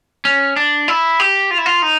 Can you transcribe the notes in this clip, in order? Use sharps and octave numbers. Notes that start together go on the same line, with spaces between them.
C#4
D4
E4
G4
F4
E4
F4
D#4